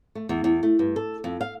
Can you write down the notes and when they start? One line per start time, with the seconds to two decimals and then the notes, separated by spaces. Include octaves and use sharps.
0.15 A3
0.29 E2
0.44 E2
0.63 A3
0.79 G2
0.96 A4
1.24 F2
1.41 F5